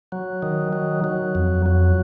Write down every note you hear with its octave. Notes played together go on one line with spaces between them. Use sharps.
F#3
D#3
F#3
F#3
F2
F#3